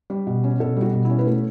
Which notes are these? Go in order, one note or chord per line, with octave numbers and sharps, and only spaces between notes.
G3
B2
C#4
B2 A4
G3
F#4
B2
C#4 E4
B4
A3 A4